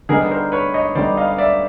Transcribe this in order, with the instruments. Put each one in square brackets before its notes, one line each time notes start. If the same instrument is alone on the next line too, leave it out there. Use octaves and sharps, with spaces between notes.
[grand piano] D3 G3 B3 D#4 [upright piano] G#4 A#4
[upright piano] A#4 C5
B4 C#5
C#5 D#5
[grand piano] D3 G3 B3 D#4 [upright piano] C5 D5
[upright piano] D#5 F5
D5 E5